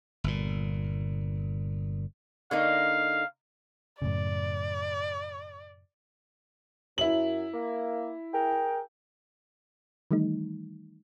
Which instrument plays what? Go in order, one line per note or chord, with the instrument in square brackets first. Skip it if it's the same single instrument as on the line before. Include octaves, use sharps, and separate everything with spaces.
[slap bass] G1 A#2
[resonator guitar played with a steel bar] D3 A#3 D#4 [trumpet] F5
[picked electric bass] F#2 A2 C#3 [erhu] D5
[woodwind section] F#2 [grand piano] E4 F#7
[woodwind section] A#3
G#4 A#4 G5
[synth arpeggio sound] D#3 E3 G3 A3 D#4